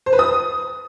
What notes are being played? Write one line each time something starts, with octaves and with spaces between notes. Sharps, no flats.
C5
B4
D#6